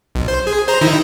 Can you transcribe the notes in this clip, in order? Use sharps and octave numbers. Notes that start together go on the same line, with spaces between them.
B1
C5
G#4
C5 A#5
D#3 D#4 E4